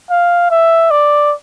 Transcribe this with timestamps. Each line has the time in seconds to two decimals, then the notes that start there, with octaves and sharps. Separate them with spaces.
0.10 F5
0.51 E5
0.91 D5